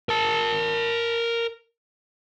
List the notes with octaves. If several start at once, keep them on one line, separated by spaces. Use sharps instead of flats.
A#4 A5